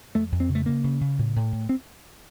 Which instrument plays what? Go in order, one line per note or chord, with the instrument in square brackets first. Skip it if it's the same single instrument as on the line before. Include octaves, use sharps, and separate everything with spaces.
[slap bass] F2 A3
F2
C4
C#3
A3
C#3 A#3
C#3
C#3
A2
A2
A2
C4